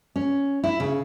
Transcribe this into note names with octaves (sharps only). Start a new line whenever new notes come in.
C#4
E4
C#3